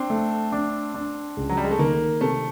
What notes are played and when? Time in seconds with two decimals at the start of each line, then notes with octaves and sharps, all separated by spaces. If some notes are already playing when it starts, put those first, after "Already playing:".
Already playing: C4 D4
0.10 A3
0.52 D4
0.94 D4
1.37 C#2
1.49 F#3
1.57 G3
1.64 G#3
1.71 A3
1.79 D#3 A#3
2.21 C3 A3